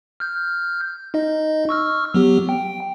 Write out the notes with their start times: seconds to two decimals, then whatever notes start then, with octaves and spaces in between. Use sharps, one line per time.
0.20 F6 G6
1.14 D#4 D#5
1.69 C#6 E6 F6
2.14 F#3 B3 G4
2.49 G5